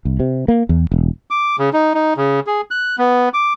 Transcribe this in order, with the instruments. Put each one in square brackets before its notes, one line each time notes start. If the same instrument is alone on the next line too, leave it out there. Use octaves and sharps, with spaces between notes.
[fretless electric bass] C2
C3
A#3
E2
E1
[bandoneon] D6
C#3
D#4
D#4
C#3
G#4
F#6
B3
D6